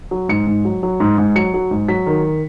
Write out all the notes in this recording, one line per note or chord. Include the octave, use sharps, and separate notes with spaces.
F#3
G#2 C#7
G#2
F#3
F#3
G#2
G#2
F#3 C#7
F#3
G#2
F#3 B6
D#3